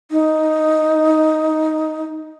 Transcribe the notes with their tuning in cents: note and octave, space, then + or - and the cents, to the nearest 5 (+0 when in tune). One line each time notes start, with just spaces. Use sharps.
D#4 +5